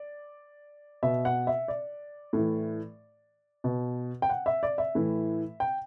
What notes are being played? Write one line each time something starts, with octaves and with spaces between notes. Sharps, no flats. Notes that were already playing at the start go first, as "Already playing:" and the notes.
Already playing: D5
B2 E5
F#5
E5
D5
A2 E3
B2
G5
F#5
E5
D5
E5
A2 E3
G5